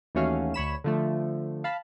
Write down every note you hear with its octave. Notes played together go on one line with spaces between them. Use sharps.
D#2 E3 A3 C#4 F#4 F5
D2 C#5 B5 E7
D3 F3 A3
F5 A5 B5